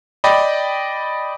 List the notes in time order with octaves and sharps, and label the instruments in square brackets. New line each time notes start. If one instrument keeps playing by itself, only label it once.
[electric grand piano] D5 D#5 G5 B5